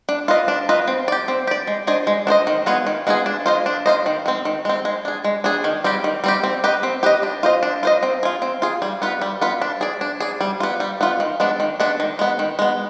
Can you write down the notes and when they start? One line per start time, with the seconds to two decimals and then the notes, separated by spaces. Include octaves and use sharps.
0.09 D4
0.28 F4 B4 D#5
0.48 D4
0.69 F4 B4 D#5
0.88 C4
1.08 G4 D5
1.28 C4
1.47 G4 D5
1.67 G#3
1.87 D4 G#4 C5 D#5
2.07 G#3
2.27 D4 G#4 C5 D#5
2.47 D#3
2.66 G#3 B3 F4 G#4
2.87 D#3
3.07 G#3 B3 F4 G#4
3.26 D4
3.46 F4 C5 D#5
3.66 D4
3.86 F4 C5 D#5
4.06 D#3
4.26 G#3 C4
4.45 D#3
4.65 G#3 C4
4.85 G#3
5.05 D4 G#4
5.24 G#3
5.44 D4 G#4
5.64 D#3
5.84 G3 C4 G4
6.04 D#3
6.24 G3 C4 G4
6.44 C4
6.64 G4 B4 D#5
6.83 C4
7.03 G4 B4 D#5
7.23 D4
7.43 F4 C5 D#5
7.63 D4
7.83 F4 C5 D#5
8.03 C4
8.23 F4 G#4
8.42 C4
8.62 F4 G#4
8.82 G3
9.02 B3 F4 B4
9.21 G3
9.41 B3 F4 B4
9.62 D4
9.81 G#4 D5
10.01 D4
10.20 G#4 D5
10.41 G3
10.60 B3 F4
10.80 G3
11.01 B3 F4
11.20 D#3
11.40 G#3 B3 D4
11.60 D#3
11.80 G#3 B3 D4
12.00 D#3
12.19 G#3 B3
12.39 D#3
12.59 G#3 B3